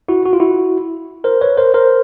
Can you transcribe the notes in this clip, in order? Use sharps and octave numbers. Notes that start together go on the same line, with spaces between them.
E4 F#4
F#4
F4
E4 F#4
A#4 C5
B4 C#5
A#4 C5
A#4 C5